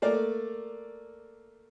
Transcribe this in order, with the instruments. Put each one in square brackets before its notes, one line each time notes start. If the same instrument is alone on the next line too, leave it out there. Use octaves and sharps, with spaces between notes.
[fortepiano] A3 A#3 A#4 D5